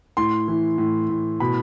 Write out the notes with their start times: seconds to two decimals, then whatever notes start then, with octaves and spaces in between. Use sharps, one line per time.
0.17 A2 C6
0.48 E3
0.78 A2
1.10 A2
1.40 B2 B5